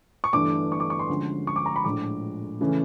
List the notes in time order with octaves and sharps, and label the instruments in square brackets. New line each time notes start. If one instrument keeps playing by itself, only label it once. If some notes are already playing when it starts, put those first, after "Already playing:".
[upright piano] C#6
G1 G2 E3 A3 D4 D6
C#6
D6
C#6
C6
D2 D3 F3 G#3 C#4
C#6
D6
A#5
B5
A#1 A2 F3 G#3 D6
C#3 E3 A3 C#4